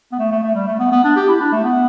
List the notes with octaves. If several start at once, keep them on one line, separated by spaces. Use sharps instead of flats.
B3
A3
A3
A3
G3
A3
B3
B3
D4
G4
E4
D4
A3
B3